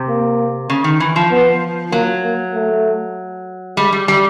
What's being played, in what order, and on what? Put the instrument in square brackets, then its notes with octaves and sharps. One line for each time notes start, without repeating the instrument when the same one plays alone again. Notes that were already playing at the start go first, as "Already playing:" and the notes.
Already playing: [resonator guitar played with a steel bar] C3
[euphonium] A#3
[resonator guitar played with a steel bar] C#3
D#3
E3
F3
[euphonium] B3
[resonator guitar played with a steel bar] F#3 [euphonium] A#3
[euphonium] A#3
A3
[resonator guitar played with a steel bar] G3 [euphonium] G#3
[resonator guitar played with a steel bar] G3
G3